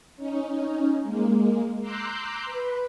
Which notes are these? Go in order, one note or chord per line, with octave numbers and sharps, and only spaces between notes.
C#4 D#4
G#3 A#3
A#5 C6 D6 E6 F#6 G6
B4